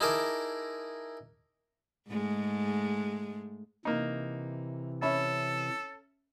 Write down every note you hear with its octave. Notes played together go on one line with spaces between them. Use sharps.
D#4 E4 G#4 A#4 A5 D6
G#2 G#3 A3
C3 E3 A#3 D#4
C#4 A4 E5 B5